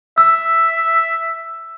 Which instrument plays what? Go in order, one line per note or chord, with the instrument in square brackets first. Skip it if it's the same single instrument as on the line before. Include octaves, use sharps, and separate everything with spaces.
[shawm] E5 [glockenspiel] E6